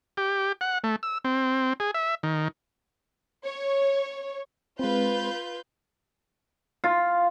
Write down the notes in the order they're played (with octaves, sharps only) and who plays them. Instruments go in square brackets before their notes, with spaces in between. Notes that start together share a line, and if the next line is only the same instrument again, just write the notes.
[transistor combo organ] G4
F#5
A3
E6
C4
G#4
E5
D#3
[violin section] C#5
[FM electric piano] G#3 C4 [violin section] F4 B4 G6
[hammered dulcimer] F4